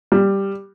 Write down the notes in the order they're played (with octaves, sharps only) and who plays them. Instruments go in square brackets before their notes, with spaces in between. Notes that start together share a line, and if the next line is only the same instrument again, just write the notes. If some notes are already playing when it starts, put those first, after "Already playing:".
[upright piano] G3